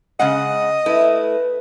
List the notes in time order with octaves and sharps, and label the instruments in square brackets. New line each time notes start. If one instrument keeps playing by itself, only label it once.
[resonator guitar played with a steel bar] C#3 G#3 F#5 [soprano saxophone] D#5
[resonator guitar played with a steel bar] A3 E4 [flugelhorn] B4